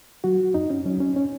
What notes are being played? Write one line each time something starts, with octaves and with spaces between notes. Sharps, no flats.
F#3 F#4
F#2 D#4
C#4
F#3 C#4
C#4
C#4